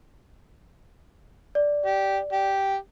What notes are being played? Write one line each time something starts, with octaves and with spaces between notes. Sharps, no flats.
D5
G4
G4